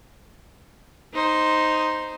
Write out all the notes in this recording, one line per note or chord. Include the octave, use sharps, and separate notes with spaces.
D#4 C5